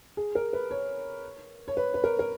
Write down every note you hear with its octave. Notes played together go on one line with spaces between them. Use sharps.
G#4
A#4
B4
C#5
C#5
B4
B4
A#4
A#4